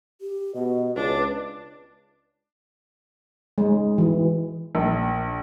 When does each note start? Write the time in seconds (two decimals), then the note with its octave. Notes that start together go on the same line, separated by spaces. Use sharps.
0.21 G4
0.55 B2 D#5
0.96 C#2 D4 B4
3.58 G#3
3.98 E3
4.75 A#1